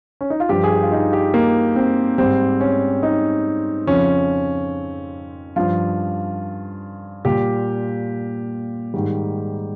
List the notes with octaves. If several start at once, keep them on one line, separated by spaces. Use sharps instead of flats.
C#4
D#4
F4
G2 F3 G4
G#4
G4
F4
D#4
G4
A#3
C4
G#2 G3 C4
C#4
D#4
F2 C#3 F3 C#4
G2 F3 F4
A#2 G3 G4
G#2 D#3 G3